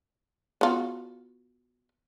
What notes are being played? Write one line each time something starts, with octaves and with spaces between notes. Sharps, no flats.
B3 F4 F#4